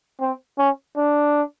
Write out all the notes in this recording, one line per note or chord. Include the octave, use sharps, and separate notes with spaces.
C4
C#4
D4